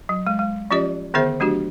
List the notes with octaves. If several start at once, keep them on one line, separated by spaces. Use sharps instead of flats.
F#3
G#3
G#3
F3 C#4 F4 G4 D5 D#5
D3 D#3 B3 G#4 C5 E5
F#3 A3 D4 F#4 G4